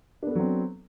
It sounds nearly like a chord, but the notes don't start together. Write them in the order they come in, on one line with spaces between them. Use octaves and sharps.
D4 B3 A4 F#3 C4